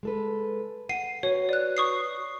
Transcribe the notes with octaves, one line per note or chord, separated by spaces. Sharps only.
G#3 A4 B4
F#5 G5 C7 D#7
F#4 B4 C#5
D5 F#6
C#6 D#6 C7